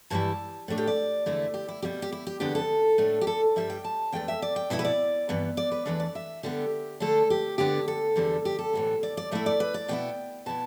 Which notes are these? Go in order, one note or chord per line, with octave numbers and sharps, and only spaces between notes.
G2 E3 G3 E4 A5
A2 A3 D4
G4
D5
E2 D3 A3 E4
G4
E4
B2 G3 E4 G4
G4
E4
G4
E2 D3 B3 D4 G4
A4
A2 A3 D4
G4
A4
G2 G3 D4 E5
G5
A5
E2 E3 A3 D4 G5
E5
D5
G5
B2 B3 E4 E5
B4
D5
G2 E3 B3
D5
B4
E2 E3 A3 D4 B4
D5
E5
D3 G3 B3 G4
D3 A3 D4 A4
G4
D2 D3 B3 D4 G4
A4
E2 D3 G3 D4
G4
A4
A2 E3 B3
D5
D5
A2 A3 E4 E5
D5
B4
D5
B2 B3 E4 G5
B2 B3 E4 A5